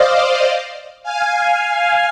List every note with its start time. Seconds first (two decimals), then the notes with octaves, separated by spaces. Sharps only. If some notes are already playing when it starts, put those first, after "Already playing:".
Already playing: C5 D5 D#5 F5
1.03 F5 G#5